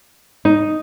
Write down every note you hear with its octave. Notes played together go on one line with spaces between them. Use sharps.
D#4